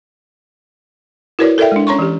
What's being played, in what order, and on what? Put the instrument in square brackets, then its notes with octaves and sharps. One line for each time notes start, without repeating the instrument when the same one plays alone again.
[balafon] E4 F#4 A#4 B4 C#5 D5
A4 A#4 D5 E5 G5
G#3 D4
C#4 C#5 A#5 C6 C#6
E3 G4